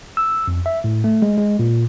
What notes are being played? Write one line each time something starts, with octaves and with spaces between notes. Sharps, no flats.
E6
F2
E5
A2
A3
G#3
G#3
A#2